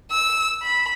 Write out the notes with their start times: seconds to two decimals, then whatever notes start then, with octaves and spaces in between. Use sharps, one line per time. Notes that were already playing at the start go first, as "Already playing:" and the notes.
0.11 E6
0.63 B5